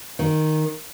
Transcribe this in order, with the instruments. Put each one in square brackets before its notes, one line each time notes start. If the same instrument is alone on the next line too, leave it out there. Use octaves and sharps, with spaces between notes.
[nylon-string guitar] D#3